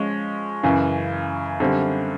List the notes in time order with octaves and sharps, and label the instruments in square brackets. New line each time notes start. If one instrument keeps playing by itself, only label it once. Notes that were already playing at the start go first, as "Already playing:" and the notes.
Already playing: [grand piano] F3 G#3 C#4
F#2 C#3 E3
F#2 D3 G3 C4